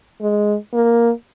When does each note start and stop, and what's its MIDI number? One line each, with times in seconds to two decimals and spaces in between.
0.21 0.56 56
0.74 1.11 58